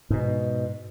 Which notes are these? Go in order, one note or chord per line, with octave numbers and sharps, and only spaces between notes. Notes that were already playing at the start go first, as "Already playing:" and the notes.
G#2 B2